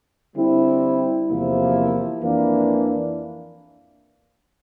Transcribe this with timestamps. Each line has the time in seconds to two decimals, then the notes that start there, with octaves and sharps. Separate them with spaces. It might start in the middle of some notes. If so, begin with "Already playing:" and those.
0.36 D3 G3 C4 E4
1.29 E2 C3 F3 A#3 E4
2.22 F2 E3 A#3 D4